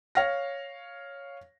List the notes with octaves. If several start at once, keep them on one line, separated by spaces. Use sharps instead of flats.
C#5 F5 F6 A#6